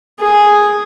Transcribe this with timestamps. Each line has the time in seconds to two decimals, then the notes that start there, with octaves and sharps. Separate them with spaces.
0.20 G#4